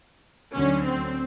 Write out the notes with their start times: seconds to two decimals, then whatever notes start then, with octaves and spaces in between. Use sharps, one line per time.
0.55 D2 D3 F#3 C#4
0.86 C4